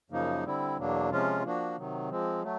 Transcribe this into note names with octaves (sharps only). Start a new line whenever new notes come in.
F#2 C#3 F3 A#3 D#4
D3 G3 C4 E4
E2 B2 F#3 A#3 D4
C3 F3 G#3 C#4 F4
F3 A#3 D4 F#4
C3 D#3 F#3
F3 G#3 C4
F#3 A3